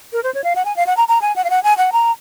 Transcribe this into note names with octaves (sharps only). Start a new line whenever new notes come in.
A#4
C5
C#5
F5
F#5
G#5
F5
F#5
A#5
A#5
G#5
F#5
F5
F#5
G#5
F#5
A#5